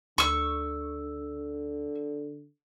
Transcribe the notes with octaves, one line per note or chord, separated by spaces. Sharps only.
D2 D3 C#6 E6